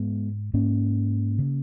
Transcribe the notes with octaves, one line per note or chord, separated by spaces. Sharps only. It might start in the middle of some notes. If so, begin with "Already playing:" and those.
Already playing: G#2 G#3 B3
G#2 A#3 C#4
C#3